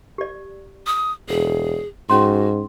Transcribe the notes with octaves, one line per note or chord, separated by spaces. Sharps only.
G4 D5
D#6
E1 G#4
G#2 C#4 F#4 C6